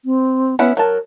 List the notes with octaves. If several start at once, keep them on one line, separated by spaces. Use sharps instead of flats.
C4
B3 C#4 E4 F#5
F#3 A#4 A5